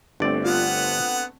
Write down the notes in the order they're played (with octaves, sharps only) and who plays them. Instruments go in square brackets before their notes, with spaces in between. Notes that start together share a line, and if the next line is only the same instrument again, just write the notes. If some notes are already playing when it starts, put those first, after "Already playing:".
[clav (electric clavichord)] G1 D5 [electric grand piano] D3 A3 C4
[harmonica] B3 F#5 [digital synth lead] F4